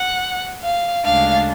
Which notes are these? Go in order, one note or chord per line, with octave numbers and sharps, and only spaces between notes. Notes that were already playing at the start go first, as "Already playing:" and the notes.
Already playing: F#5
F5
D2 C#3 G#3 D4 F5